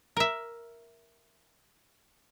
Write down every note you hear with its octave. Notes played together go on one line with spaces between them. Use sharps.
A#4 E5